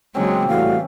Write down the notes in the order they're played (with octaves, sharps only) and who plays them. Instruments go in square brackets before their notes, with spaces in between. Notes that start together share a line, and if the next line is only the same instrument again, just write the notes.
[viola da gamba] C#3 F#3 A#3 [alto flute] G#3 [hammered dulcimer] C4 C#4 G4
[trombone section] A2 G3 F#4 [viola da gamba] E3 [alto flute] F5